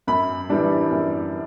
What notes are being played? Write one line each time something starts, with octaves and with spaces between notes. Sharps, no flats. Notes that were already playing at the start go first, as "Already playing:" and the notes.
F#2 B5
E3 G3 D4
F#2